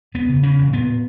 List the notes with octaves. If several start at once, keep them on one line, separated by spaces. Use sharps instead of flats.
E1 B3
C#3
C#3 C#4
E1
A#2 B3